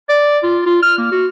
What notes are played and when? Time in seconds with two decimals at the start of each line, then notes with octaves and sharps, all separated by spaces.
0.09 D5
0.43 F4
0.66 F4
0.82 F6
0.98 A#3
1.11 F#4